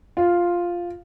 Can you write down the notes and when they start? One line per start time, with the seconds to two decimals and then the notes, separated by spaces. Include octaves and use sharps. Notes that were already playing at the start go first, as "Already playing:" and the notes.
0.17 F4